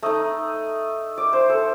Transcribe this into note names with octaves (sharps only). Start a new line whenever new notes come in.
A3 D#4 D#5
D5
C5
A4